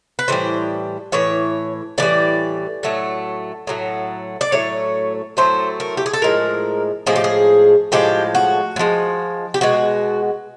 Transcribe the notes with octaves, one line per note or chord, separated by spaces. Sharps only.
B4
A2 E3 G3 C5
A2 E3 C#5
A2 E3 G3 D5
A2 F#3 A3
A2 F#3 A3
D5
A2 F#3 A3 C#5
A2 F#3 A3 C5
A#4
G4
G#4
A4
A2 F3 G#3 A#4
A2 F3 G#3 G#4
G4
G#4
A2 F3 G#3 G4
F#4
A2
F3 G#3
G4
B2 G#3 F#4